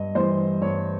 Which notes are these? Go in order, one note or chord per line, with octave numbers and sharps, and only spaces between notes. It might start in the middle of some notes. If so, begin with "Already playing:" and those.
Already playing: G2 D#5
E3 G3 C5
G2 C#5